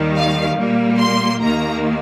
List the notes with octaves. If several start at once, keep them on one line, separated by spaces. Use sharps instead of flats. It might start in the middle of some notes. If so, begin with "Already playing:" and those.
Already playing: D#2 D#3 G3
F5
A#2 G3 A#3
C6
D#2 D#3 A#3 A#5